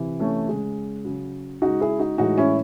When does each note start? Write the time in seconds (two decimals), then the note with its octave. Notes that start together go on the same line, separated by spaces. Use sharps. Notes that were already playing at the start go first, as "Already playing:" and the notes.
Already playing: C3 E3
0.19 A3 C#4
0.48 C#3 G#3
1.04 C#3 F#3
1.62 C#3 G#3 D#4 F#4
1.80 E4 G#4
1.99 D#4 F#4
2.18 A2 E3 G#3 D#4 F#4
2.38 C#4 E4